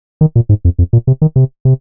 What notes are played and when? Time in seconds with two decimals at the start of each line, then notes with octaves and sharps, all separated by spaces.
0.21 D#3
0.36 A#2
0.49 G#2
0.65 F2
0.79 F2
0.93 A#2
1.07 C3
1.22 D#3
1.36 C3
1.65 C3